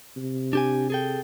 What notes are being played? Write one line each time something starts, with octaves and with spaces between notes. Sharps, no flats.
C3
D4 G4 G#5
G#4 A4 G5